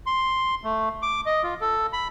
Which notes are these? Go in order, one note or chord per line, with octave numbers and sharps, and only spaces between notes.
C6
A3
D6
D#5
F4
A4
B5